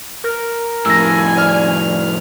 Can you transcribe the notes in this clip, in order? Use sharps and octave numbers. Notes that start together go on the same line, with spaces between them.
A#4
F2 A2 G#5 E6 A#6
D5 F6